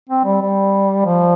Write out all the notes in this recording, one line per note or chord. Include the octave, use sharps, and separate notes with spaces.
C4
G3
G3
F3